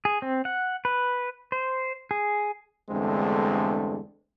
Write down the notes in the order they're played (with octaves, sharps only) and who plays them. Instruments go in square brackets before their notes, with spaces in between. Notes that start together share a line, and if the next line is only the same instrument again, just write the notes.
[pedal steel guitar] G#4
C4
F#5
B4
C5
G#4
[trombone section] E2 G2 D3 G#3 A3 C4